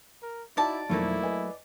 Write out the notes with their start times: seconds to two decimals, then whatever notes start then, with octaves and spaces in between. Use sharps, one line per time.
0.22 A#4
0.57 D#4 E4 F#4 D5 A5
0.89 B1 F2 F#3 A3 A#3 E4
1.23 B4 D#5 G#5